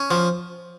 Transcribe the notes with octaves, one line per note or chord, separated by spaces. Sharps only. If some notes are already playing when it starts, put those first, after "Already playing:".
Already playing: C#4
F3